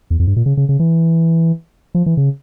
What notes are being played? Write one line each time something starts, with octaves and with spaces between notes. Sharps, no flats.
E2
F2
G2
A#2
C#3
C#3
C#3
E3
F3
E3
C#3